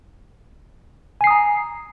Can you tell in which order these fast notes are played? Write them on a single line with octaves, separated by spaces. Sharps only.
G#5 C7 D#6 A#5